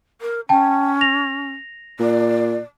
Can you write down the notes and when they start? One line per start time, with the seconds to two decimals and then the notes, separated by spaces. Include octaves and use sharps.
0.21 A#4
0.49 C#4 G5 A5
1.01 A#6 F7
1.99 A#2 D5